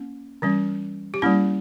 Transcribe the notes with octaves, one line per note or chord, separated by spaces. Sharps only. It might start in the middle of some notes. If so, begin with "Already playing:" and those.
Already playing: A#3 C#4
E3 G3 C#4
G4
G3 A#3 C#4 E4